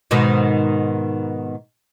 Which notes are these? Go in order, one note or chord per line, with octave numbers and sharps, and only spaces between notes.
G#2 B2 D#3